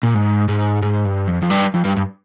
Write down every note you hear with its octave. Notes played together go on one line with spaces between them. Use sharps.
A#2
G#2
G#2
G#2
G2
F2
F2
G2
F2
G2
G2